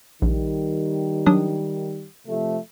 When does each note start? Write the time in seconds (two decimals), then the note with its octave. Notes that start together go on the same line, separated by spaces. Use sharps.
0.22 A#1 D#3 G3
1.26 F#3 D4 D#6
2.28 C3 F3 A3